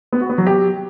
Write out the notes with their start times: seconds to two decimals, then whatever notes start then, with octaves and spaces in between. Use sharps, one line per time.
0.13 B3
0.21 F#4
0.30 B3
0.38 F#3
0.47 G4